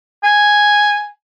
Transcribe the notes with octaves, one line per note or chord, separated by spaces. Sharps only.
G#5